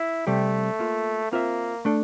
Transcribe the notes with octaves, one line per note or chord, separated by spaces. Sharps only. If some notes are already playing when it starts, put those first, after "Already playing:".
Already playing: E4
C3 G3 A3 C4 G4
A#3 F4 A4
A#3 C4 F4 C5 E5
A3 D4 A4